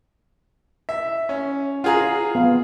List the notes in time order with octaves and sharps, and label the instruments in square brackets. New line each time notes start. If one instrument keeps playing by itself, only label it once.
[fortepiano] E5
C#4
[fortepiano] F4 G#4 [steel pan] F#5 A#5
[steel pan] B3 F5